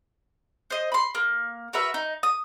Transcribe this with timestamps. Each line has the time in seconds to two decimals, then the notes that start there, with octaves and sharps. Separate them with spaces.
0.70 C5 D#5
0.92 B5 C6
1.15 A#3
1.73 F#4 A#4 B4 E5
1.94 D#4
2.23 D#6